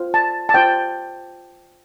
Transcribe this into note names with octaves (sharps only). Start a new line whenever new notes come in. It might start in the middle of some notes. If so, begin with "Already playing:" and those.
Already playing: F4 C5
A5
A5
F4 C5 G5